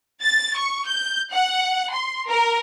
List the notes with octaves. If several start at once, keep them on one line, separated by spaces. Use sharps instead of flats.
A6
C#6
G6
F#5
C6
A#4